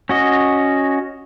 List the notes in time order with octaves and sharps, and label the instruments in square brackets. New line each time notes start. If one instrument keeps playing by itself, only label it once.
[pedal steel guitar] C#4 F#4 D#5